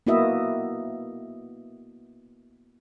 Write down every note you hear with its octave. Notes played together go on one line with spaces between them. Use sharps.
A#3 B3 E4 F#4 D#5 E5